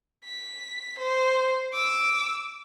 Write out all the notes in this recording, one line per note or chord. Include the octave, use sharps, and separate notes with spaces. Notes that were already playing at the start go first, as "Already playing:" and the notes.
B6
C5
D6 E6